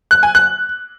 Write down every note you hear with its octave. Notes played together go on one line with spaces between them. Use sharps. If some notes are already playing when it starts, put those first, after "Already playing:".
F#6
G#5
F#6